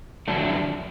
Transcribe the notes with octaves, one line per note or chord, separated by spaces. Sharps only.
F2 D3 F#3 A3 D4